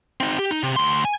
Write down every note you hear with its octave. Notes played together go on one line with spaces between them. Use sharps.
C4 D#4
G4
D#4
C3
D2 C6
G#5